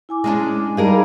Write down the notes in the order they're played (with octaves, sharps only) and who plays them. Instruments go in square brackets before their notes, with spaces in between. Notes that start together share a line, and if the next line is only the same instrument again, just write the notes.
[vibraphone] E4 G#5 D6
[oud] G#3 C#4 D4
[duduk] G3 [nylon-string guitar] D#4 G#4 A#4 [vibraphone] F5 A5